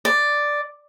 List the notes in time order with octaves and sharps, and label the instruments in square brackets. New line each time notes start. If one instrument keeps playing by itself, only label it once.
[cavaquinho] D5